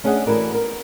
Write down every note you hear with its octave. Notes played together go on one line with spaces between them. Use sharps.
A3 C#4 D4 G#4 D#5 F#5
E3 A3 E4 F#4 A#4 D5
B3 A#4